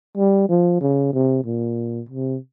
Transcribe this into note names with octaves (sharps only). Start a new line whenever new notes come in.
G3
F3
C#3
C3
A#2
C3